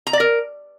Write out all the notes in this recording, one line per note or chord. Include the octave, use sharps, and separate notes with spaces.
A#5
D5
A#4